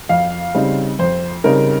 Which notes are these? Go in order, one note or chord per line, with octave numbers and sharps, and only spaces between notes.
F2 F5
C#3 G3 C4 D#4
F2 C5
C#3 G3 C4 D#4 A#4